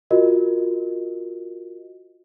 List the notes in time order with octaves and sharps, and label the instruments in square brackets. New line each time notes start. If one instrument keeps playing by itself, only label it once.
[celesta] F4 F#4 A#4 D#5